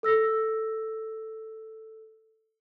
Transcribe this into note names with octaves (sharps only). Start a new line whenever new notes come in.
A4 E6 A#6